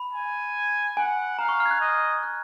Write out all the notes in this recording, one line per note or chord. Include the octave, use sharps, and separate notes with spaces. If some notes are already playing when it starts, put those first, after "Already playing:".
Already playing: B5
G#5
F#5 G#5
F5 A#5
C#6
F6
G#6
F#6
D#5
F#6